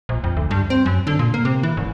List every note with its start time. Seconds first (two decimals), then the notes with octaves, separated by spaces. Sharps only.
0.09 A#1
0.24 F2
0.37 D2
0.51 G2
0.70 C4
0.86 F#2
1.07 D3
1.19 A#2
1.34 A#3
1.45 C3
1.63 E3
1.77 G#1